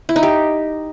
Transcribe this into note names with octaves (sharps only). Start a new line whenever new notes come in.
E4
D#4
G4